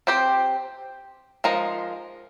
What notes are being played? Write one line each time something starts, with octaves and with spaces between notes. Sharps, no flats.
C4 G4 C5
F3 G#3 D#4 A#4